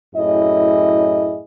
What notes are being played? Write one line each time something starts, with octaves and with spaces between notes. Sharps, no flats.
F#2 A2 E4 G#4 D#5